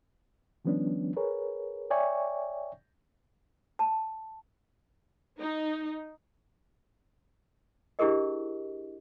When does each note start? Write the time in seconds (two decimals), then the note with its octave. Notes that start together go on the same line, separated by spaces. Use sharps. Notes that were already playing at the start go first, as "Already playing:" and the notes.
0.65 D#3 F3 G3 B3 C#4 D4
1.17 G#4 A#4 B4 C#5
1.91 C#5 D5 E5 G5 G#5 C#6
3.79 A5
5.39 D#4
7.99 D4 E4 G4 G#4 A#4 D#5